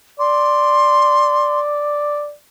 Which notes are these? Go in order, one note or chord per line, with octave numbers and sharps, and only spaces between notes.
D5 C6